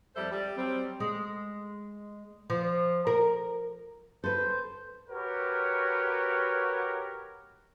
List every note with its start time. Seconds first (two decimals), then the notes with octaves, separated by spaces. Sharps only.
0.15 F2 G3 A4 C5 E5
0.30 G3
0.56 F#3 G3 C4
1.00 G#3
2.50 F3
3.07 A#4
4.24 A4 B4 C5
5.10 F#4 G4 A#4 B4 C#5